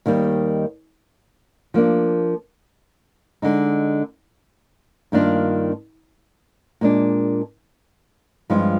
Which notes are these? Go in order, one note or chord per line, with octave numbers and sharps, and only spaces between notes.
D#2 D#3 G3
F3 A#3 D4
D3 G#3 D#4
G2 D#3 A#3 D4 F4
A#2 G#3 D4
G2 F3 G#3 C4 F4